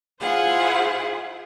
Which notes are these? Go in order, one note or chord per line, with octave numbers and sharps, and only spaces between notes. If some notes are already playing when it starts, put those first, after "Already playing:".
E4 F4 G#4 C5 F5 F#5